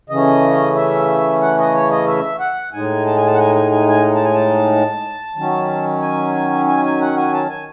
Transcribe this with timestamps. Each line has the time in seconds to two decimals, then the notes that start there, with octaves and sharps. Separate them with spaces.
0.09 C#3 E3 A3 C#4 D#5
0.75 E5
1.42 F#5
1.59 D#5
1.74 C#5
1.91 D#5
2.07 E5
2.40 F#5
2.73 A2 G#3 D#4 G#5
3.07 A5
3.16 G#5
3.26 A5
3.34 F#5
3.39 G#5
3.55 G#5
3.71 G#5
3.88 G#5
4.15 A5
4.25 G#5
4.34 A5
5.36 D#3 F#3 C#4
6.02 G#5
6.68 G#5
6.85 G#5
7.01 F#5
7.17 G#5
7.33 A5
7.50 G#5